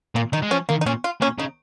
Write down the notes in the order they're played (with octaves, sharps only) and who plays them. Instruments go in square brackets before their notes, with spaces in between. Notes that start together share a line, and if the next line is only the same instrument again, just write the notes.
[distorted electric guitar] A#2 [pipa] A#3
[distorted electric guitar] D#3 [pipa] D#4
[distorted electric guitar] G#3
[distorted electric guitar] F3 [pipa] C#4
[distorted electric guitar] D#3 [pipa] A#3
[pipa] D#4
[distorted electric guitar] A#2 [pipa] C#4
[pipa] F4
[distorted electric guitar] A#2 [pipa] C#4
[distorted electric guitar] C#3 [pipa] D#4